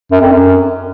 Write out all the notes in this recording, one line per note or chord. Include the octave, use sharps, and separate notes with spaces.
F#2
F2
F#2